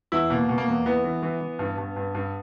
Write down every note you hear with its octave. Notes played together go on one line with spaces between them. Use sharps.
E2 E4
B2 A#3
B2
A#3
E2
E3 B3
E3
E3
E3
G2
G2
G2
G2